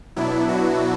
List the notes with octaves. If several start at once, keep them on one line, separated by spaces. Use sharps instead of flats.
B2 F#3 B3 D4 E4
F#4